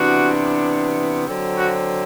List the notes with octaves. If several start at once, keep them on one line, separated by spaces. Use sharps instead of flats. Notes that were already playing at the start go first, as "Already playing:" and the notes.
Already playing: C3 E3 B3 D4 F#4
D3 F#3 C4
F#4